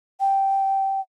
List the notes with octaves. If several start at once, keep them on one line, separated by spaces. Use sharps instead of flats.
G5